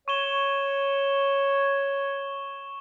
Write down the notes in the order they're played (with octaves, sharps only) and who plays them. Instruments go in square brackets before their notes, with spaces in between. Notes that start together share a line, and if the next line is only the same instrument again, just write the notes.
[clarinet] C#5 [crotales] C#6 E7 G7